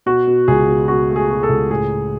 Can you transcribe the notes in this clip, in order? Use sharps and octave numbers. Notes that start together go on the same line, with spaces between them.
B2 F#4
B2
C#2 G#4
B2
B2 F#4
A3
G#4
B2
A4
C#2
A2 G#4